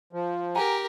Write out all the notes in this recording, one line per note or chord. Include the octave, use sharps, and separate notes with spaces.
F3
G4 A#4 F#5 G#5 A#5